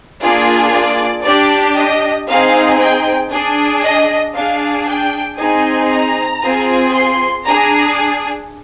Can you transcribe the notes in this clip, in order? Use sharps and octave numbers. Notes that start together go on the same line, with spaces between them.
A#3 D4 F4 G#4 D5
D5
D4 G4 D5
D#5
C4 D#4 G#4 F5
G5
D4 G#4
D#5
D4 G#4 F5
G5
C4 D#4 G#4 G#5
A#5
C4 F4 G#4
C6
D4 G#4 A#5